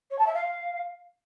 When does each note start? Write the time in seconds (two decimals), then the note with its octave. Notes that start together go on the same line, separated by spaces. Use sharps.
0.11 C#5
0.19 A5
0.27 E5
0.34 F5